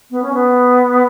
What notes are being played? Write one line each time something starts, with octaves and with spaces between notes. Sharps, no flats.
B3
C#4
B3